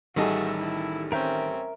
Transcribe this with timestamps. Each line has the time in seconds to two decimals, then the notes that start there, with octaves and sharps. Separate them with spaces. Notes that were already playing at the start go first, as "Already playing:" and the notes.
0.16 A1 D#3 G3 D#4 F#4 G#4 A4 E5
0.58 E4
1.12 C4 C#4 A#4 E5 G6